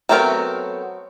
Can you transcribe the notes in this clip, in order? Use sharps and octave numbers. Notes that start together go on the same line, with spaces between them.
F#3 A3 B3 C4 A#4